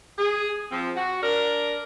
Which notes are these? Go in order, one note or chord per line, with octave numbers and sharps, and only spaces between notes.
G#4
F3 C4
F#4
D4 A#4